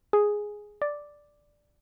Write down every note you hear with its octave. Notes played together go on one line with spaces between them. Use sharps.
G#4
D5